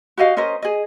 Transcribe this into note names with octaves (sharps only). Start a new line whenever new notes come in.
F#4 G4 D#5 F5
C#4 A#4 C5 D#5
G#4 D#5